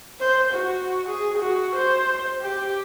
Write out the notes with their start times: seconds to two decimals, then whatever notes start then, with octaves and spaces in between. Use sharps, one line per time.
0.20 C5
0.53 F#4
1.09 G#4
1.38 F#4
1.76 C5
2.42 G4